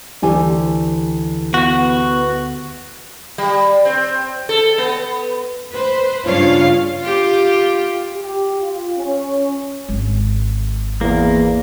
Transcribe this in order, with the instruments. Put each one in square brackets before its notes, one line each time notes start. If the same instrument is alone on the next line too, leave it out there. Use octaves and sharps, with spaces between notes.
[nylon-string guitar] D2 G4 G#5 [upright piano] E3
[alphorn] B3 [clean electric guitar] F#4
[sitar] G3
C4
A4
B3
[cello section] B4 C5
G2 C#3 D4 F4 C#5 F5
[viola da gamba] F4 G4
[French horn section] G4
F4
C#4
[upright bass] G#1 G#3
[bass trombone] E2 [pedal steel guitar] A#3